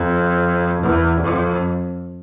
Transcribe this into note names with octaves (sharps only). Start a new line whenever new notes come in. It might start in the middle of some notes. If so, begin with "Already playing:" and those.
Already playing: F2
E2
F2